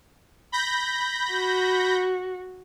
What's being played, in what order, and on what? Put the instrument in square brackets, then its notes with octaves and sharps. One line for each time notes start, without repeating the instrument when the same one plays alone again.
[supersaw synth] B5 G6 A#6
[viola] F#4